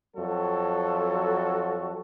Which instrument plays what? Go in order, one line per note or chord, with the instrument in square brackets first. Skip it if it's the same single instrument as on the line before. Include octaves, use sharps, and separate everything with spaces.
[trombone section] F2 F#3 F#4 A4